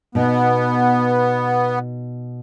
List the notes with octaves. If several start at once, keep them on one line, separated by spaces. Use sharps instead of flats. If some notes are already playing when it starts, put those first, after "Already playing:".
B2 B3 D#4